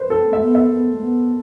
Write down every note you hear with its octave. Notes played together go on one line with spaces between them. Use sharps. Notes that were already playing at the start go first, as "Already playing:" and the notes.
Already playing: B4 C5
C4 A4
A3 E5
B3
E5
B3
A3
B3